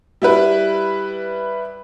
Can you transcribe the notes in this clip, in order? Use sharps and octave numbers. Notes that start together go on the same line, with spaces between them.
G3 E4 B4